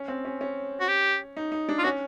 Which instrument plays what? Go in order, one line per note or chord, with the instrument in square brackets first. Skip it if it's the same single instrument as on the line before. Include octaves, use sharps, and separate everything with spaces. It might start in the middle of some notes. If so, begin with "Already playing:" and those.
Already playing: [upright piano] C#4
C4
C#4
C#4
[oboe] F#4
G4
[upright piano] D#4
D#4
D4
[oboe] F4
[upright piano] C#4 [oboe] F#4